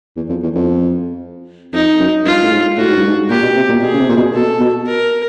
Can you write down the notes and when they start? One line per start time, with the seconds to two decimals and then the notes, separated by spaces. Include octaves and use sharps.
0.16 E2
0.29 F2
0.43 E2
0.55 F2
1.73 F2 D#4
1.99 F#2
2.26 G2 F4
2.42 A2
2.51 G#2
2.77 A2 F#4
2.88 G#2
2.97 G2
3.08 G#2
3.30 A#2 G4
3.43 B2
3.56 C3
3.69 A#2
3.82 B2 G#4
3.94 C#3
4.00 C3
4.09 A#2
4.17 B2
4.34 B2 A4
4.60 B2
4.87 A#4